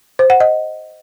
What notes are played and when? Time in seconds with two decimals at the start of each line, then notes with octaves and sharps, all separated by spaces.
0.19 C5
0.30 F#5
0.40 D#5